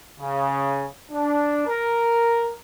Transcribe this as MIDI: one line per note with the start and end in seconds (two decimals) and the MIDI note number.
0.20 0.86 49
1.12 1.66 62
1.68 2.53 70